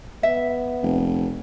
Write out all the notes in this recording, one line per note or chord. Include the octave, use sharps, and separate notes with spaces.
B3 E5
F1